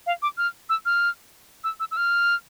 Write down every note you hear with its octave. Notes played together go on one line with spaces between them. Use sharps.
F5
D6
F6
E6
F6
E6
E6
E6
F6